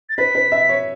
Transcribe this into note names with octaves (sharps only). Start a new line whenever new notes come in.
A6
B4 B6
B4
E5
C#5